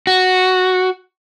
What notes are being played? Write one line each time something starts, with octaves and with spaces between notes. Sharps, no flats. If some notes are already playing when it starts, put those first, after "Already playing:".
F#4